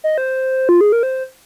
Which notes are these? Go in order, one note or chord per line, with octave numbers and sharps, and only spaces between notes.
D#5
C5
F4
G#4
A#4
C5